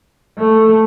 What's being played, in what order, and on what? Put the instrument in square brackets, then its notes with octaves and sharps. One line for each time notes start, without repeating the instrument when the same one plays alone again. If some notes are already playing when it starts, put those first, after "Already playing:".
[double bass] A3